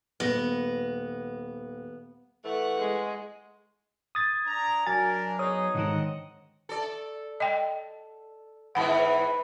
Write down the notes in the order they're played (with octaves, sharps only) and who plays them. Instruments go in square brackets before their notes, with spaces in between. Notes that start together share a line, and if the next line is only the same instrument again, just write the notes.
[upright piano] D#1 A#6 [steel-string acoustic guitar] B3
[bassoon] E3 [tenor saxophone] A3 [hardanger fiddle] F#5 C#6
[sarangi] G#3
[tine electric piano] D#6 A6 [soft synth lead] G#6
[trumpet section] D4 A#5
[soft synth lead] F#3 [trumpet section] D4 A#4 [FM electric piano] G#5 [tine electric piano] A6
[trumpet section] B3 D#4 G#4 [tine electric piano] C#5 [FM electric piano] D#6
[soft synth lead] G#2 [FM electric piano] D3 D#3 [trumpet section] C4 D#5 F#5
[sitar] A4 D5
[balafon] D#5 G5
[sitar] E2 G#2 E3 [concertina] B4 [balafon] F#5 B5